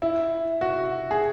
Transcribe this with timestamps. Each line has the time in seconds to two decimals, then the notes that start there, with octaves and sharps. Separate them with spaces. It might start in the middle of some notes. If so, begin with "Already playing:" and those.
0.02 E4
0.61 F#4
1.11 G#4